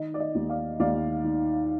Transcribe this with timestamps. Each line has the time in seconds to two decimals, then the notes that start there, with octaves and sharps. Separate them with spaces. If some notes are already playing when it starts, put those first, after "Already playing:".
Already playing: D#3 D#5
0.14 D5
0.20 D#5
0.35 D#2
0.49 D5 F5
0.80 D#2 D5 F5
1.24 D#3